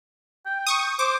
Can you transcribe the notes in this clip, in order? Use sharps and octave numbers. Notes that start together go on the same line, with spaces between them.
G5
C#6 D#6
C5 D6